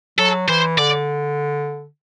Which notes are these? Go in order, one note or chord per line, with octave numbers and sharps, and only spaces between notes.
F#3 A4
E3 C5
D3 D5